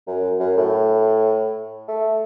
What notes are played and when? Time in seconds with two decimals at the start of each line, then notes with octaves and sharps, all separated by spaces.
0.07 F#2
0.40 F#2
0.57 A2
1.88 A3